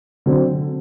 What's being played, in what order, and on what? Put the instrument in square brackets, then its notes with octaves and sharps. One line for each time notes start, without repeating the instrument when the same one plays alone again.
[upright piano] D3 F#3 C4